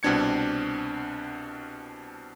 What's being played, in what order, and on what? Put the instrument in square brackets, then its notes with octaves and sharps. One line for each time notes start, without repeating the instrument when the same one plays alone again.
[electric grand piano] C2 B2 C4 D4 G#6 C#7